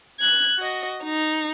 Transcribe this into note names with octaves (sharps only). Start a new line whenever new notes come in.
F#6 G#6
F#4 D#5
D#4